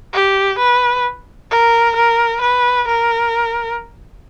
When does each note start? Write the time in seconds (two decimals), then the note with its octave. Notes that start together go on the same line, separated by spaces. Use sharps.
0.13 G4
0.59 B4
1.51 A#4
1.96 A#4
2.41 B4
2.88 A#4